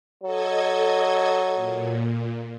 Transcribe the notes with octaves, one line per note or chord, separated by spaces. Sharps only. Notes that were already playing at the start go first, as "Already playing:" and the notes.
F#3 A4 D#5 G#6
A#2